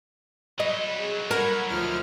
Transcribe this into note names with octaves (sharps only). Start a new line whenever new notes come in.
F#3 D#4 D#5 B5
G#4
A#4 F#5 B5 G#6
D2 F3 F6